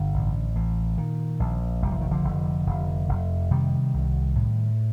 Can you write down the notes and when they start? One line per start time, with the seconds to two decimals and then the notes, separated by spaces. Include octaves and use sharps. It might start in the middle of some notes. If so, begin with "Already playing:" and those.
Already playing: G1 D3
0.14 A1
0.55 A1
0.98 A#2 D#3
1.40 A#1
1.82 F1 G3
1.92 F3
2.01 D#3
2.11 D3 F3
2.24 F1
2.66 F1
3.09 F1
3.51 C3 D#3 G3
3.94 C2
4.35 A2